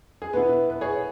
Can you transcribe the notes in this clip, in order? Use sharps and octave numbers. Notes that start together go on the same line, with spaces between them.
G#4
B2 B3 E4 B4
B4
G#4 C#5